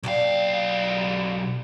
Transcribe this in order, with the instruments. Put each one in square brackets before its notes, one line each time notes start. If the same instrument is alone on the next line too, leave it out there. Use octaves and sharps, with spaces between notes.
[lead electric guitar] B1 F5 [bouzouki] A#2 D4 G5